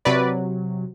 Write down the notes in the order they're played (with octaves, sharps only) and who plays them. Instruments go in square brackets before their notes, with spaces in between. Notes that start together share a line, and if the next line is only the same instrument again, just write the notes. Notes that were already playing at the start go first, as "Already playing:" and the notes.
[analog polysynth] C3 F#3 B4 D5